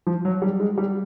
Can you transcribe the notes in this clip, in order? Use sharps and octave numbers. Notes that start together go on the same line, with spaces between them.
F3
F#3
G3
G#3
G3